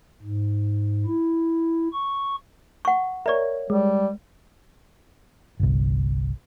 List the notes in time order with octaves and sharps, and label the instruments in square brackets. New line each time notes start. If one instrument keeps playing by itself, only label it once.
[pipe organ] G#2
E4
C#6
[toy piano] F#5 C#6
[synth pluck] A#4 C#5 [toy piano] D5 E5
[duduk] G3 [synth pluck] G#3
[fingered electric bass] G1 C2